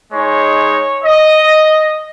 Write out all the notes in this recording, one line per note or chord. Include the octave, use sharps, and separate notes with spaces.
G#3 D#4 C#5
D#5